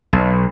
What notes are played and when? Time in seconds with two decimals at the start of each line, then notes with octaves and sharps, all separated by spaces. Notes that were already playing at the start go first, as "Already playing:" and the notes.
0.13 B1